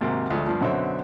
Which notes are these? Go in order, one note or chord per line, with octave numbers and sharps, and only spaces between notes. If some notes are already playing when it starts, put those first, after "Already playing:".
D#2 G#2 C3 F#3 A#3
D2 F3 G#3 A3
G2 F3
F#2 B2 D3 C4 C#5 E5